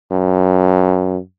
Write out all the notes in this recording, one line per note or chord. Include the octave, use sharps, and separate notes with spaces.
F#2